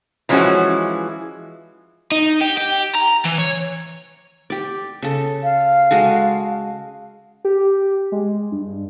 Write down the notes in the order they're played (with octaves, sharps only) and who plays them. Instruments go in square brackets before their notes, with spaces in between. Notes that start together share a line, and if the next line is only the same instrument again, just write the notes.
[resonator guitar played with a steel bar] E3 F3 G#3 C#4 E4 F#4
[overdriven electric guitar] D#4
G4
G4
A#5
E3
C#5
[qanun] G4 D5
C#3 A4
[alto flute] F5
[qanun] G#3 F#4 A4
[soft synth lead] G4
G#3
G2